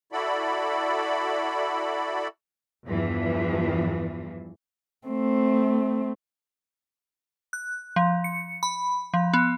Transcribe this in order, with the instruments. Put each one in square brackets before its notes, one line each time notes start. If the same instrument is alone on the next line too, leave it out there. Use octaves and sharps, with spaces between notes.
[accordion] E4 F#4 A4 D5 B5
[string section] E2 G2 E3 F3
[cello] A3 C4
[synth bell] F#6
F3
C#7
B5
F3
B3